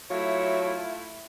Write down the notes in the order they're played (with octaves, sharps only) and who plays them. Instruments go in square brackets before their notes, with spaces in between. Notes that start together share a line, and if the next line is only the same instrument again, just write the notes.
[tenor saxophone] F#3 [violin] A3 E4 [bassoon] F4 [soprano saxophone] C#5